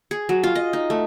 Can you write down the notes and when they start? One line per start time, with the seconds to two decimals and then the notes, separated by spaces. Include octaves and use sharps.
0.11 G#4
0.29 F#3
0.44 F4
0.55 D#5
0.73 D#4
0.90 A3